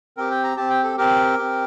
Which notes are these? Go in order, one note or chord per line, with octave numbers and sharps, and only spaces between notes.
C4 G4 A#4
G5
A#5
C4 G4 A5
G5
A4
C4 G4 A#4
C4 G4